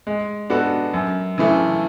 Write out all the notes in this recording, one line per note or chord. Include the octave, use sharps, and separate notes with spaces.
G#3
B3 D4 F#4 A4
F#2
C#3 E3 A3